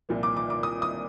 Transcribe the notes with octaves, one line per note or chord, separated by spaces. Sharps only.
C2 A#2 F3 A#3
D6
D6
D6
D#6
D#6